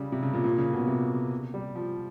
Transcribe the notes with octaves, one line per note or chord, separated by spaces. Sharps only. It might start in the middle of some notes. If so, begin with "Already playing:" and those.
Already playing: C#3 G3
C3
C#3
A#2
A#2
C#3
B2
C3
G3
F3